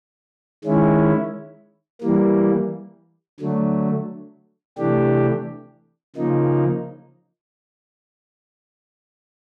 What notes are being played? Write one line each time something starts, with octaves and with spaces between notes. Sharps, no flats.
D#3 G#3 C#4 E4
E3 G3 A#3
D3 F#3 A3
C3 E3 A3 D4 G4
C#3 F3 A#3 D#4